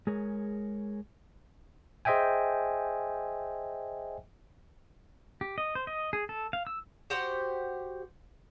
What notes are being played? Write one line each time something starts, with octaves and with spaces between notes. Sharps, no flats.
G#3 G#4 A#4 C#5
G#4 C5 D#5 E5 G5 G#5
G4
D#5
C5
D#5
G#4
A4
F5
E6
F#4 G4 C5 F#5